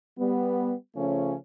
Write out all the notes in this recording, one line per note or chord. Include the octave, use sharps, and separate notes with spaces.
G3 B3
C#3 F3 A3 C#4